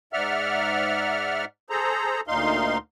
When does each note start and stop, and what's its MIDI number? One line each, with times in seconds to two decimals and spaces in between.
0.13 1.45 44
0.13 1.45 74
0.13 1.45 76
0.13 1.45 78
0.13 1.45 89
1.70 2.21 68
1.70 2.21 69
1.70 2.21 72
1.70 2.21 82
2.28 2.77 38
2.28 2.77 46
2.28 2.77 63
2.28 2.77 77
2.28 2.77 84